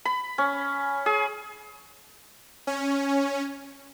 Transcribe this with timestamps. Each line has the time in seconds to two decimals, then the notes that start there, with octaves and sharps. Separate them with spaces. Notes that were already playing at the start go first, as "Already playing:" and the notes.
0.05 B5
0.38 C#4
1.06 G#4
2.67 C#4